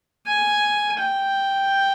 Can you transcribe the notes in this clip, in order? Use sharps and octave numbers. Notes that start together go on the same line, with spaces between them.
G#5
G5